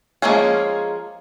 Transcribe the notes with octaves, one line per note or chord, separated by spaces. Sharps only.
F3 G#3 A#3 C#4 G#4